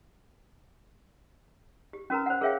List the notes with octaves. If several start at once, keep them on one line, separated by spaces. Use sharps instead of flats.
G4
C#4 F#4 A#4 B4 A#5
C5 F#5
G#4 A#4 C#5 E5 F5 G5